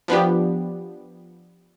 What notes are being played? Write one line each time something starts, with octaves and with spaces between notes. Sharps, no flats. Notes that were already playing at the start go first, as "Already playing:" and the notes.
F3 B3 D4 G4